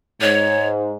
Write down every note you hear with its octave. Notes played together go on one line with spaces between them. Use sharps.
G#2 C#5